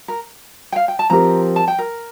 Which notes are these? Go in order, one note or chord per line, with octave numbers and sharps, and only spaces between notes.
A#4
G5
F5
G5
A5
F3 C4 G4 A#4 A#5
A5
G5
A#4